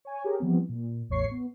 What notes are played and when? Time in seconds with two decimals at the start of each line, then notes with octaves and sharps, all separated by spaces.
0.05 C#5 G#5
0.24 G4 G#4 A#4 C#5
0.39 E3 F3 G3 B3 C4
0.69 A#2
1.09 A1 E2 A2 C#5 C#6 C7
1.31 B3